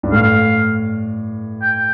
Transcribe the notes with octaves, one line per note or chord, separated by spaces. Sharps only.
G2
A2 F5
G5